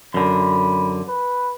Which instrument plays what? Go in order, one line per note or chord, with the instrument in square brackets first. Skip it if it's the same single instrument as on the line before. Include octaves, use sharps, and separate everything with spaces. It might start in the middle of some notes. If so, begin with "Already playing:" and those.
[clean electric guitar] F#2 D3 [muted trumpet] B5
[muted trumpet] B4